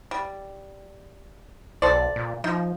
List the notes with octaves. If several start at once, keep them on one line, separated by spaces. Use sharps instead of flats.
G3
B1 A4 C5 D5
A#2
F3 D#4